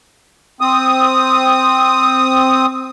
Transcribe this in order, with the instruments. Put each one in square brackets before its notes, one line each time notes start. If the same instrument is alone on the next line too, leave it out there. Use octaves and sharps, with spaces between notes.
[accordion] C4 D#6